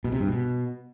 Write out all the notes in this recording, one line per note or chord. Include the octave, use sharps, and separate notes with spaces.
B2
C3
G2
B2